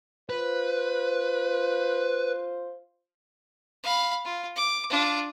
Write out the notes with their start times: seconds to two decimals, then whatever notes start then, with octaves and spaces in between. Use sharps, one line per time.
0.30 F4 B4 C5
3.83 F5 B5
4.25 F4
4.56 D6
4.90 D4 F4